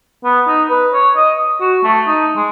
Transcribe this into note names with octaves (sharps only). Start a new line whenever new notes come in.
B3
D#4
B4
C#5
D#5
F#4
A3
D#4
G#3